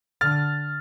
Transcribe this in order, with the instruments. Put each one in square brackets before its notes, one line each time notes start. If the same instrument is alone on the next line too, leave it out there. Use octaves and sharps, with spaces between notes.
[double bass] D3 [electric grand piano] F6 A6